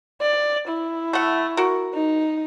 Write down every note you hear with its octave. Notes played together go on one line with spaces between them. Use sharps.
D5
E4
A3 F#5
F#4 A#4
D#4